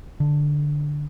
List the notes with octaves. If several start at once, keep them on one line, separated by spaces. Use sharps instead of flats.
D3